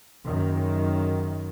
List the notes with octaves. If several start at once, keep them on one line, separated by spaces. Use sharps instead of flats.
F#1 F#2 D#3